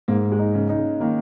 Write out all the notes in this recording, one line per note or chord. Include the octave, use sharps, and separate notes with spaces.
G#2 A#3
G#3
D#4
C#3
D#4
C#3
D#3 A#3